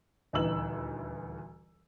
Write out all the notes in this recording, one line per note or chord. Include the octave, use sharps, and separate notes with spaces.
D#1 D2 E3 D#4 E6 F#7